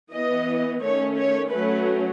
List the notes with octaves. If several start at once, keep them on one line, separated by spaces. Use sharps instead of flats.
E3 B3 D#5
D#3 A3 C#4 C#5
C#5
F#3 A3 C#4 B4